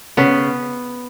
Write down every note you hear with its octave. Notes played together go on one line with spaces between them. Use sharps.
C#3 B3